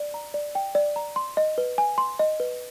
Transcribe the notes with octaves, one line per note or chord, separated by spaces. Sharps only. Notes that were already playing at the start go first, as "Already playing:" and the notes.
Already playing: D5
A#5
D5
G5
D5
A#5
C6
D#5
B4
G#5
C6
D#5
B4